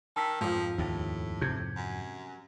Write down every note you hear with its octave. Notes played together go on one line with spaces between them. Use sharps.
D#3 A5 E6 B6
F2 G#2 F3
D#2 A2
C3 G6 G#6
F#2